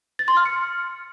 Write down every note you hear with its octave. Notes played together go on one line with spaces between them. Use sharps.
A6
C6
F6
C#7